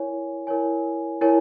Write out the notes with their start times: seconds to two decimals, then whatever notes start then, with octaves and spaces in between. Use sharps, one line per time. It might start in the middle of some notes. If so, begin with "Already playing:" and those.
Already playing: E4 A#4 C#5 G#5
0.47 E4 A#4 C#5 G#5
1.21 E4 A#4 C#5 G#5